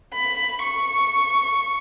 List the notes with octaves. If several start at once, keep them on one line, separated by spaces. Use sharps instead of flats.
B5
C#6